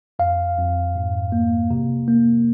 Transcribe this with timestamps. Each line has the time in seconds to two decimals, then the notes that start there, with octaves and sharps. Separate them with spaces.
0.19 F2 F5
0.58 F2
0.96 G#2
1.32 A#3
1.71 C3
2.08 A#3